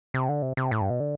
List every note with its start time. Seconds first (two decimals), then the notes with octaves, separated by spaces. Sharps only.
0.14 C3
0.29 D3
0.42 C3
0.57 C3
0.71 A2
0.81 G2
0.90 B2
1.00 D3